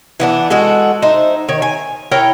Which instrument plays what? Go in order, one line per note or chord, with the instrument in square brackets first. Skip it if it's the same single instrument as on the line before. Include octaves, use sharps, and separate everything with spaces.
[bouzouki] E3 B3 D4
G#3 A3 F#4 A4
D#4 C5 E5
D#3 C#5
G#5
E4 A#4 C#5 G5